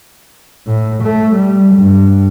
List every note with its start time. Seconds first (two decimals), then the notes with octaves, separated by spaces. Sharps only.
0.67 A2
1.04 A3
1.35 G3
1.76 G2